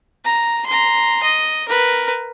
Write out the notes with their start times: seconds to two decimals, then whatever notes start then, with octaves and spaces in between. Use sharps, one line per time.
0.25 A#5
0.66 A#5 C6
1.23 D#5
1.68 A#4 B4